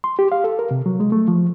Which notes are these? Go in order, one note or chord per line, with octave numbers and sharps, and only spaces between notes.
C6
G4
F5
A4
A#4
C3
F#3
G#3
A3
F3